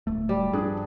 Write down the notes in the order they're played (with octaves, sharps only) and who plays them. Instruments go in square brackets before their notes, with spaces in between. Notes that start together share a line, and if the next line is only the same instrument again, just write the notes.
[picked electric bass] D1 A3
[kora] G3
[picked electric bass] G2 [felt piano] F3 D4 G#4